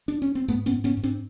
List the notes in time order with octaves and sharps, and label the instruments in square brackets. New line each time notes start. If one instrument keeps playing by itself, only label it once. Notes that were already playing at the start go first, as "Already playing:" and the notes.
[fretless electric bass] D4
C#4
C4
G#2 A3 B3
B3 C#4
G#2
B3 C#4
G#2
C4 D4